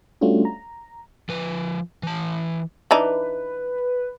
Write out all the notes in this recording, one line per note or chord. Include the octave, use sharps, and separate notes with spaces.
G3 A3 C#4 D4 F4 F#4
A#5
F3 B4
E3 A5
E3 D4 D#4 B4